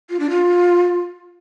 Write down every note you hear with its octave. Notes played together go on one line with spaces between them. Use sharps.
F4
D4
F4